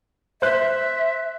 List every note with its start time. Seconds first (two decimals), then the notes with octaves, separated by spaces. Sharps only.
0.42 C5 E5 C6 F#6